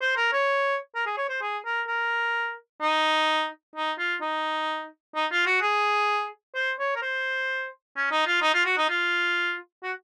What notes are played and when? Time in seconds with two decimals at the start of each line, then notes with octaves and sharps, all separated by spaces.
0.01 C5
0.17 A#4
0.33 C#5
0.95 A#4
1.06 G#4
1.18 C#5
1.29 C5
1.42 G#4
1.65 A#4
1.88 A#4
2.82 D#4
3.75 D#4
3.98 F4
4.21 D#4
5.15 D#4
5.31 F4
5.46 F#4
5.61 G#4
6.55 C5
6.79 C#5
6.95 A#4
7.02 C5
7.96 C#4
8.11 D#4
8.27 F4
8.42 D#4
8.54 F4
8.65 F#4
8.78 D#4
8.89 F4
9.83 F#4